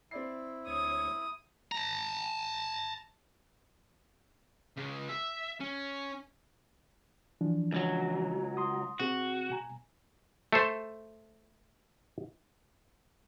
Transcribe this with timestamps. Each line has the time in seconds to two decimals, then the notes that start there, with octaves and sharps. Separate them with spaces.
0.11 C4 E4 D5 C7
0.67 D2 C#5 D#6
1.72 A5 A#5
4.77 C#3 G#3
5.09 E5
5.60 C#4
7.41 E3 F3 D4
7.72 C#2 F#3
8.57 C6 D#6
9.00 B2 C4 F#4 G#4
9.50 B2 G#5 A#5
10.53 A3 A4 C5